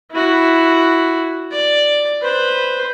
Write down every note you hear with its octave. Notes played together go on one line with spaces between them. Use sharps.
E4 F#4
D5
B4 C5